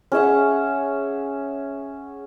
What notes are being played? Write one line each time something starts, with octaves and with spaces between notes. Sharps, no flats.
C#4 G#4 E5 F#5